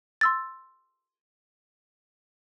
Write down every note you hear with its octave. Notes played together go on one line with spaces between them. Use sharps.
C6 E6 A6